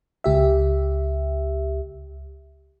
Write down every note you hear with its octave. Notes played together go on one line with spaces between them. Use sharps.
C#2 G4 E5